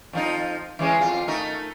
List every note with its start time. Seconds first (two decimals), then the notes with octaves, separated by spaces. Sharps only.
0.13 F2 F3 D#4
0.79 E3 G#3 C#4
1.01 F2 F4
1.28 A3 D#4 A#4